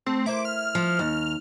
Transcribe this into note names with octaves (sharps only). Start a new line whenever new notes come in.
A3 C4
E4 A#4 C5 D6
F6
F3
D#2